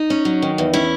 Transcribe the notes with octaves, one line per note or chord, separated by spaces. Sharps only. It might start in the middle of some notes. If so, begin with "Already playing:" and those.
Already playing: D#4
C#4
F#3
D#3
E2
C#4 E4